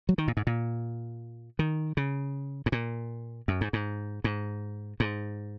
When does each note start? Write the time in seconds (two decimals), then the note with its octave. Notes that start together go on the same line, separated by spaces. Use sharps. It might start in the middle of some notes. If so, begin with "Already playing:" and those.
0.09 F#3
0.18 D#3
0.28 A#2
0.37 G#2
0.47 A#2
1.59 D#3
1.97 C#3
2.66 G#2
2.72 A#2
3.48 F#2
3.61 G#2
3.73 G#2
4.24 G#2
5.00 G#2